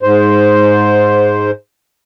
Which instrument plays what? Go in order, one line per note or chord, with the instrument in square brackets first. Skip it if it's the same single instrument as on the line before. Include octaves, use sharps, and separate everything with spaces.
[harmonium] G#2 C5